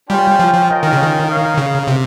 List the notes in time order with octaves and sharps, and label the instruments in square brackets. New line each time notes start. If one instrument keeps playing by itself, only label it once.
[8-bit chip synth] G3 [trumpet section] C#4 F4 C5 G5
[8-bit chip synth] F3
F3
[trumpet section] C#4 F4 A#4 D#5 G5
[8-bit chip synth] D#3
C#3
D#3
[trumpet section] D#4 A#4 C#5 F5
[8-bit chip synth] C#3
C3